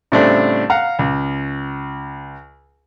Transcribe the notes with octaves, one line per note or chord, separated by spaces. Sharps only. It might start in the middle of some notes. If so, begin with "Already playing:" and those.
A2 C#3 G3 A3 C4 D4
F5 F#5 A#5
C#2